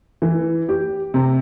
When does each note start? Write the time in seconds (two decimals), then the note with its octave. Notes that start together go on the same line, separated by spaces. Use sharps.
0.22 E3
0.69 G4
1.14 C3